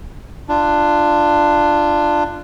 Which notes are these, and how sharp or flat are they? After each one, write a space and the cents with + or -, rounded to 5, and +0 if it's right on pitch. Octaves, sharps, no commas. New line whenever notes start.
D4 +15 F4 -20